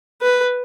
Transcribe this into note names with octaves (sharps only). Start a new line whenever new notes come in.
B4